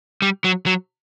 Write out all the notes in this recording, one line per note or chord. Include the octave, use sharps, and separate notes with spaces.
G3
F#3
F#3